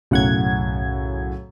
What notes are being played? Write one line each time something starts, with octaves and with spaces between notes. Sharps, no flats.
B1 F#2 A2 C#3 F#5 G#6